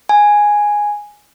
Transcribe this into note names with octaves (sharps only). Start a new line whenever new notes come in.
G#5